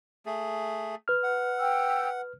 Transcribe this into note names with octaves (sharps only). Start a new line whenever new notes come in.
A3 G#4
B4 F6
F#5
G5 E6